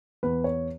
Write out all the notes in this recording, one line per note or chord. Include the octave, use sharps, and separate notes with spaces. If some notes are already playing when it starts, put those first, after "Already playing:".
E2 B4
C#5